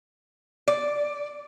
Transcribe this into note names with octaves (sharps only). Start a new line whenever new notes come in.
D5